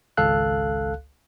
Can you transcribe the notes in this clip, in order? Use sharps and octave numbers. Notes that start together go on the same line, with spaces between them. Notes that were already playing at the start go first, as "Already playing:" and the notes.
G#1 C#2 A4 F5 F#6